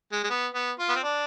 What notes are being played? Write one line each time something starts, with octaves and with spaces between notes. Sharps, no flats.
G#3
G#3
B3
B3
F4
B3
C4
D4